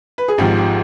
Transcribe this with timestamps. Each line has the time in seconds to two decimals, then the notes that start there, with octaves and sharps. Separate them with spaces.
0.18 B4
0.28 G#4
0.38 G#1 G#2 F3 G4
0.57 G4